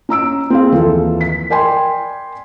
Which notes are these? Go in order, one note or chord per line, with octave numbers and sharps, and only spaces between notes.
C#4 A#5 E6 D7
C4 G#4 F5
D#2 E3 F3 G#4 A4 F5
B6
A#4 D5 G5 G#5 B5 C6